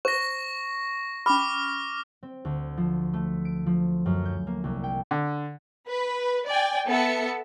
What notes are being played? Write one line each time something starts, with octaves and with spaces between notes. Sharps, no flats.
C5 C#6 A#6
C#4 B5 D6 F6
C4
D2
F3
A3
D7
F3
F#2
G6
A#3
C2
G5
D3
B4
D5 G5 G#5
B3 A4 E5 C#7